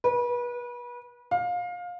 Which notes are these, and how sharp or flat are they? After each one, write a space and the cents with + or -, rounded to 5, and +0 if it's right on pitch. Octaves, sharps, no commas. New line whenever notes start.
B4 -30
F5 +25